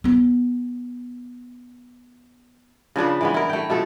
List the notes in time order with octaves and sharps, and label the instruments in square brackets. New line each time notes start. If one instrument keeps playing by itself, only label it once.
[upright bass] B3 C#4
[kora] C#3 F3 D4 B4
E3 G#3 B3
E4 A#4
A3 G5
B2 F3 A3 A4